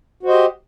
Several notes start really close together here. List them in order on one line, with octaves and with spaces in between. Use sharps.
F#4 C5 D#5 G4